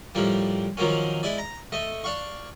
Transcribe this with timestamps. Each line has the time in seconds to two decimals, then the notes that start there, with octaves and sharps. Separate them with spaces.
0.15 A2 F3 G3 A#3
0.77 D#3 F3 F#3 A#3 C#4
1.23 G#3 E4 D5
1.38 A#5
1.72 A3 D#5
2.04 D4 F5 C#6